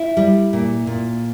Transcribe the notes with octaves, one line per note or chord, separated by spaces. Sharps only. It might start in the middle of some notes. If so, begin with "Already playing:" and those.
Already playing: E4
G3
A#2
A#2